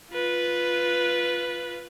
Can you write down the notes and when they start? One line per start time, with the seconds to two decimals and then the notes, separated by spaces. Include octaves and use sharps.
0.11 F4 B4